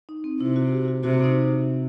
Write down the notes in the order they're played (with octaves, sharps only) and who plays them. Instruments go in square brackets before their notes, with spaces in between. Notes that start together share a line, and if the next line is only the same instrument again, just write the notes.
[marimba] D#4
C4
[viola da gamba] C3 [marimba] E4
[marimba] F#4
G4
F#4
[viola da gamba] C3 [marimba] F#4
[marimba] D#4